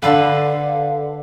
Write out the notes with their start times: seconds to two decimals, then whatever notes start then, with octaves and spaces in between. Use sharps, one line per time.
0.02 D3 A4 B4 F5